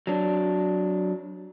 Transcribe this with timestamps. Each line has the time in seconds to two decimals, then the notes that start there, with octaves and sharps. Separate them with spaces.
0.07 F#3 D4